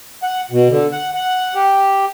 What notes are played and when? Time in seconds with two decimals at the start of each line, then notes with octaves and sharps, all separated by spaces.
0.23 F#5
0.51 B2
0.70 D3
0.92 F#5
1.14 F#5
1.55 G4